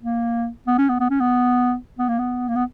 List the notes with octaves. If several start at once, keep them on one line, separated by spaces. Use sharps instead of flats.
A#3
B3
C#4
B3
B3
C#4
B3
B3
A#3
B3
A#3
B3